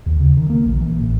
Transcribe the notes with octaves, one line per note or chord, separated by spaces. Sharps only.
D#2
C#3
D#3
A#3
A#1
E3
A1